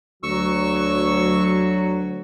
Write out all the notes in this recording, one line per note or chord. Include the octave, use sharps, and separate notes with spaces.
D2 F#3 F#4 C#6 E6